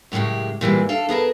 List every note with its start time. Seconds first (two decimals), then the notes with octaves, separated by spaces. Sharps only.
0.12 F#2 A2 C#3 G#3 G4
0.61 A#2 E3 G3 G#3
0.89 D4 A4 F5
1.09 B3 G#4 A#4 A5